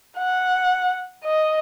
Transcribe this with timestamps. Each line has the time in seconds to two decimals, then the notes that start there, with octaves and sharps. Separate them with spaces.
0.18 F#5
1.24 D#5